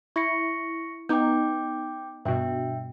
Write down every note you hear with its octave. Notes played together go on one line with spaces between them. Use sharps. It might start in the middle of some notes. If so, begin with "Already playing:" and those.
E4 C#6 A#6 C#7
B3 D#4 G5 D6 G6
G2 B2 E5 G5